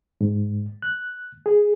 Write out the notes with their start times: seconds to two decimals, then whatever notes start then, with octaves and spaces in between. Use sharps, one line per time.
0.21 G#2
0.82 F#6
1.46 G#4